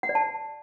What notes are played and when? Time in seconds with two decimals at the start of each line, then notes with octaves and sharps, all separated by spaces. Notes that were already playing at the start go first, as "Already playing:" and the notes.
0.03 F#5
0.09 D5
0.15 A5